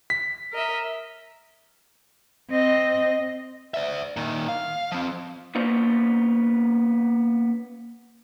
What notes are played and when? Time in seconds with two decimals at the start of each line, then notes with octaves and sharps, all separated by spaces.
0.10 B6
0.52 A#4 D#5 E5
2.50 C4 D#5
3.74 D5 E5
4.17 A#2 D#3
4.48 F5
4.92 F3 C4
5.55 A#3 B3 C#4 F4 C5 D5